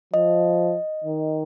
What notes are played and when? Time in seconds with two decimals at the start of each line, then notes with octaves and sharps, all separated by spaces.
0.14 F3 D#5
1.04 D#3